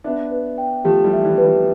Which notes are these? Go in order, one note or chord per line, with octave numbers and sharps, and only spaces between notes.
B3 D4 E5
B4
G5
F3 A3 G4
E3 G3
E5
E3 G3
B4
E3 G3